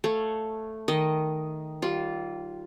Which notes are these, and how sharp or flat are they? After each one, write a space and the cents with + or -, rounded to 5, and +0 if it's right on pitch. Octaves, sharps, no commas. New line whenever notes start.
A3 +0 C#5 +0 F5 +0
D#3 +0 D#5 +0
G3 -25 F4 +0